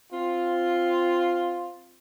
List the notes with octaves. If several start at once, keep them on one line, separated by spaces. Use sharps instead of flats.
C4 F4